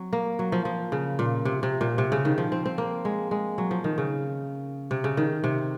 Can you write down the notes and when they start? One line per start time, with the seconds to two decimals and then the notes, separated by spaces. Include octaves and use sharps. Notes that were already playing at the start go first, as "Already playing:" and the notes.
Already playing: F#3 C4
0.13 A#3
0.39 F#3
0.52 F3
0.65 F3
0.92 C#3
1.19 A#2
1.45 C3
1.63 C3
1.81 A#2
1.98 C3
2.12 C#3
2.25 D#3
2.38 F3
2.52 C4
2.66 C4
2.78 A#3
3.05 G#3
3.31 G#3
3.58 F#3
3.71 F3
3.84 D#3
3.98 C#3
4.91 C3
5.04 C#3
5.17 D#3
5.44 C3